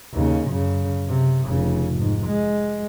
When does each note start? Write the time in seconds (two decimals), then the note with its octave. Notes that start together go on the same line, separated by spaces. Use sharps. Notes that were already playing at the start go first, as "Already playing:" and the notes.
0.13 D#2 C#3
0.48 F#2 C#3
1.07 C3
1.47 F1 C#3
1.96 G#2
2.27 G#3